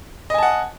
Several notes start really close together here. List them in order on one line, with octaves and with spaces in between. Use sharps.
D#5 G#5 A5 F#5